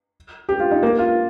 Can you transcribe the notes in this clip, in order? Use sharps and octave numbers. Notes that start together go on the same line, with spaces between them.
G4
F4
D#4
A#3
F4